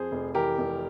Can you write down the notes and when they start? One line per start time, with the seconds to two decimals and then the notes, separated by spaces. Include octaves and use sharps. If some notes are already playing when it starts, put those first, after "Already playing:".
Already playing: F2 G#4 C5
0.12 F1
0.35 E3 G4 A#4
0.58 F1